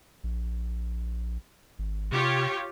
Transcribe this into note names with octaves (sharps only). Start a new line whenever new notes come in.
A#1
G#1
C3 F4 G4 C#5